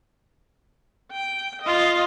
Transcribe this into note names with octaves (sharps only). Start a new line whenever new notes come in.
G5
F4 D#5